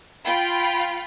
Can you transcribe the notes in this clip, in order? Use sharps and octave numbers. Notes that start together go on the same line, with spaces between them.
F4 G5 B5